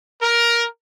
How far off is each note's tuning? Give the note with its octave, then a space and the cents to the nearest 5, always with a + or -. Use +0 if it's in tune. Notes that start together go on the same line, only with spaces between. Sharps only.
A#4 +10